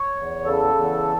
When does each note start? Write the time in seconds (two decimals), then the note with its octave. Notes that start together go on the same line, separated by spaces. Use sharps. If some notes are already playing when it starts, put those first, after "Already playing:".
Already playing: C#5
0.16 E2
0.45 C#3 A4
0.75 E2